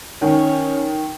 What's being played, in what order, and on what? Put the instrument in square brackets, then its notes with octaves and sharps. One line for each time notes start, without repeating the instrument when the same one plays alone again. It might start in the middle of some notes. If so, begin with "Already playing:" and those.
[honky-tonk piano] D#3 [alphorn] C#4